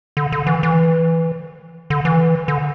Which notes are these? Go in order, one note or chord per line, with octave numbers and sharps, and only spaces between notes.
D3
D3
E3
E3
D3
E3
D3